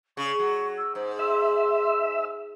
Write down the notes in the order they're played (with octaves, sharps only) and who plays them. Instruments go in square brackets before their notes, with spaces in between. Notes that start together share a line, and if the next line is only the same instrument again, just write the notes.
[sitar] C#3 [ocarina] C#6
[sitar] F#3
[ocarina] E6
[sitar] G#2 [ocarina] C5
[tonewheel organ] E5 [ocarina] C6